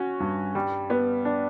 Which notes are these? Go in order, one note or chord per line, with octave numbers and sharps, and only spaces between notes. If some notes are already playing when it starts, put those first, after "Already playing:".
Already playing: C#4 F#4
G2
G3
B3
D4